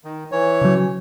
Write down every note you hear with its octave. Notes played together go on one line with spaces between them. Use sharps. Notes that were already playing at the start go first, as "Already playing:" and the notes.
D#3
E3 C#5
C#3 F#3